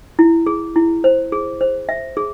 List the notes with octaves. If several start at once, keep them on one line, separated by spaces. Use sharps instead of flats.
E4
G#4
E4
C5
G#4
C5
E5
G#4